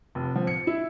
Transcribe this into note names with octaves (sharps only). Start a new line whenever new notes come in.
F1
F3
C#7
E4